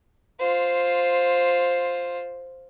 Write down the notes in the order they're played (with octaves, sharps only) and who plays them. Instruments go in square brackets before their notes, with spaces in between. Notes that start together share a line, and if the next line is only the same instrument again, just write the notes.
[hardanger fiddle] F4 C5